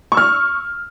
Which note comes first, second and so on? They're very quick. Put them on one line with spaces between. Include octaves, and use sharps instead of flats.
C#6 E6 F6